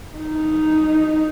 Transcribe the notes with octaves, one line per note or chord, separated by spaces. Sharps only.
D#4